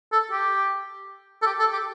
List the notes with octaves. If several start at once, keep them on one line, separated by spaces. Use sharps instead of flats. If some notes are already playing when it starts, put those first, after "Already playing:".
A4
G4
A4
G4
A4
G4